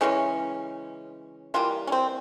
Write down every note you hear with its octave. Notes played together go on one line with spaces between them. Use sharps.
C#3 E3 G#3 C#4
E3 G3 A#3 F4
C#4
C4